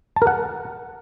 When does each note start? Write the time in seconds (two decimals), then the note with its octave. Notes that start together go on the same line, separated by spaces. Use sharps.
0.16 A5
0.22 A#4
0.27 F#5